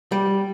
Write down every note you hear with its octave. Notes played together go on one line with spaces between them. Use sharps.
G3